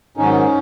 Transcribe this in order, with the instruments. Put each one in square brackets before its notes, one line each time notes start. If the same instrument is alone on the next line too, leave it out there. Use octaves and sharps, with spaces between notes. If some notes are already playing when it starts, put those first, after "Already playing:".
[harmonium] G#2 D#3 F#3 C#4 D#4